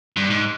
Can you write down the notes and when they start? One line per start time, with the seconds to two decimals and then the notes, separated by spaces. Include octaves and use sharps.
0.17 G2
0.30 G#2